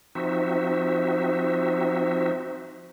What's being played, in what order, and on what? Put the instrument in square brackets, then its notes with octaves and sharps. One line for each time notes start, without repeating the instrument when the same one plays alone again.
[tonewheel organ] F3 C4 D#4 F#4 E5